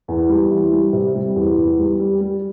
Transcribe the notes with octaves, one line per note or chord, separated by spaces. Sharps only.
E2
G3
E3
G3
C3
G3
E2
E2
G3
G3
G3